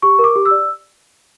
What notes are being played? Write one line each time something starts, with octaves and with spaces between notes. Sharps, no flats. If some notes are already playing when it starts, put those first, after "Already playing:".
G4 C#6
A#4
D6
G4
E6
D5